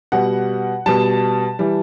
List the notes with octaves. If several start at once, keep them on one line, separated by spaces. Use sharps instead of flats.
B2 G3 F#5
B2 G3 A5
E3 G3